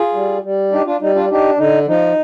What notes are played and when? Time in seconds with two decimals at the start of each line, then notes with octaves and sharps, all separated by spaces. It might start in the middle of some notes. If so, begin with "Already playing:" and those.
Already playing: F4 G#4
0.14 G3
0.44 G3
0.71 D4 D#4 G4
0.86 D4 F4
1.01 G3 D#4
1.15 D4 F4
1.30 D4 D#4 G4
1.58 D3 D#4
1.87 F3 D#4